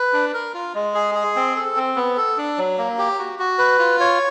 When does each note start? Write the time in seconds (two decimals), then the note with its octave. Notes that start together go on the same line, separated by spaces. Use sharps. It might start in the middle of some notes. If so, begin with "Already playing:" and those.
Already playing: B4
0.13 D4
0.34 A#4
0.54 F4
0.75 G#3
0.94 G#4
1.15 G#4
1.36 C4
1.56 A4
1.76 C4
1.96 B3
2.17 A4
2.38 D4
2.58 F#3
2.78 A#3
2.98 G4
3.19 F#4
3.39 F#4
3.58 B4
3.79 F4
4.00 C#5